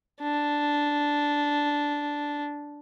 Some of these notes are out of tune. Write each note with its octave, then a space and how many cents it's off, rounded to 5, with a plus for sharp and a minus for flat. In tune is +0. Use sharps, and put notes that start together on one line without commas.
D4 -5